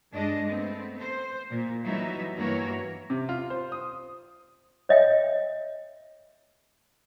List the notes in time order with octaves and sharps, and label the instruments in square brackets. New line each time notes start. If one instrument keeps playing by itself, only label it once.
[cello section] G2 G#3 D4 D#5
A3 B3 C4
C5
A#2
E3 F#3 G3 B3 D#4 E5
G2 E3 A#3 F#4 A#4 C#5
[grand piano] C3
F4
C5
D#6
[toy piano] C#5 D#5 E5 G5